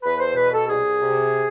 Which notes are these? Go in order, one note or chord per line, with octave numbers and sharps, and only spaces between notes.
E2 B4
C5
B2 B4
A4
C2 G#4
C3